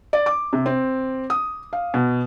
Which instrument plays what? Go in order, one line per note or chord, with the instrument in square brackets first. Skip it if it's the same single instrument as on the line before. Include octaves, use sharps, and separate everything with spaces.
[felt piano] D5
D6
C3
C4
D#6
F5
B2